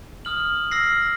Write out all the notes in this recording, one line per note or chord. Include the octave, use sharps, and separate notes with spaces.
D#6 F6 F#7
E6 F6 A#6 C7